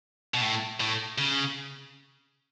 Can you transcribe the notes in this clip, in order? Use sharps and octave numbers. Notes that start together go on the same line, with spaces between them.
B2
A2
A2
C#3